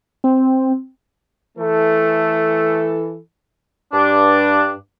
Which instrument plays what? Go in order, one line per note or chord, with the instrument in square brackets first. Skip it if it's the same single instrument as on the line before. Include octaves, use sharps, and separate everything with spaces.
[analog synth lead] C4
[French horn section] E3 A4 [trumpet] A3
[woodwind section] G2 D4